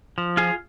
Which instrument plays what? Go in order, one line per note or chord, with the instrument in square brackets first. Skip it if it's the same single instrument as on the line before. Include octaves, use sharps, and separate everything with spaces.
[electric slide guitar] F3
[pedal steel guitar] F4 G#4